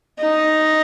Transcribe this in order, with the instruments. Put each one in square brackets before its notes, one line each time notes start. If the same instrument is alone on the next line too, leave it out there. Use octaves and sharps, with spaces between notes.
[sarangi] D#4